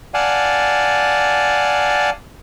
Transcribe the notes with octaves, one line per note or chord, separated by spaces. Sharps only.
D5 F5 F#5 G#5 A5